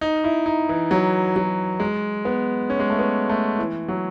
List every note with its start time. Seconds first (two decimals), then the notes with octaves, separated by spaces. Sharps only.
0.01 D#4
0.24 E4
0.46 D#4
0.69 E3
0.91 F#3
1.36 F#3
1.80 G#3
2.25 B3
2.70 C#4
2.80 G#3
2.90 A3
2.99 B3
3.29 A3
3.59 E3
3.88 F#3